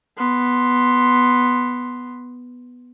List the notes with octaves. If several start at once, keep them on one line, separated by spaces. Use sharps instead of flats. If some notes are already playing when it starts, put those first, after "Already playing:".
B3 C6